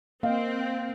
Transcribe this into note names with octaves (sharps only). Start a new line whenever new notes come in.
A#3 C4 D#5 F5